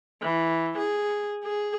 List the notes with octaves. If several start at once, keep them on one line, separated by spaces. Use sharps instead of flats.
E3
G#4
G#4